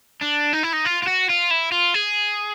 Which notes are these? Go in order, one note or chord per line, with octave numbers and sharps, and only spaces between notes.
D4
D#4
E4
D#4
F4
F4
F#4
F4
E4
F4
G#4